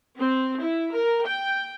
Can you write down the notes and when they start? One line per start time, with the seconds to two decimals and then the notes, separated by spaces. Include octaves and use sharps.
0.17 C4
0.59 E4
0.92 A#4
1.23 G5